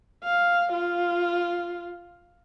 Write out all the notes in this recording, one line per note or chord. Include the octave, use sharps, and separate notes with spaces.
F5
F4